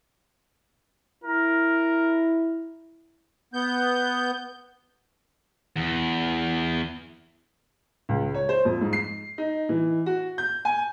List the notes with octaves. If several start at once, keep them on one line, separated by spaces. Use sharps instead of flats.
E4 A#4
B3 G6
E2
C#2
C#5
C5
F2
G#2
C7
D#4
E3
F#4
G6
G#5